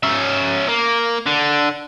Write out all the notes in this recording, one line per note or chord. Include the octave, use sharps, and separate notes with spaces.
C#4 E5
A#3
D3